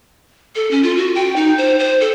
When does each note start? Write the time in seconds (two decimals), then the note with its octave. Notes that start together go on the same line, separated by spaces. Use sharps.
0.56 A4
0.71 C#4
0.83 F4
0.97 F#4
1.15 G5
1.36 D#4
1.58 C5
1.79 C5
2.01 A4